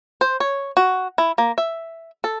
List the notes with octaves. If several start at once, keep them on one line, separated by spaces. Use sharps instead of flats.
C5
C#5
F#4
E4
A#3
E5
A4